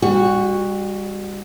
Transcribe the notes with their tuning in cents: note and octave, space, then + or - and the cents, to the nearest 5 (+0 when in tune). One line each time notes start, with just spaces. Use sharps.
G3 +35 F#4 +0